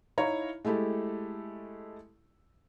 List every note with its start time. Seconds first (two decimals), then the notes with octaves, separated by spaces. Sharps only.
0.18 D#4 E4 C#5 F5 A#5
0.65 G#3 A3 E4 G4 A4